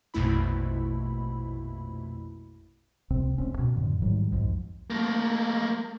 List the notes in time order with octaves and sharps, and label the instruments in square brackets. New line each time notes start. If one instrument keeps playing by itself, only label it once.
[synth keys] A#1 F2 B2 A3 E4 B5
[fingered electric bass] C#2 C3 C4
F1 C#2 C4 C#4
B2
F2 A2 D3
G#2 D#3 F#3 G3
B1 F2 G#2 F3
[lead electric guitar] A3 A#3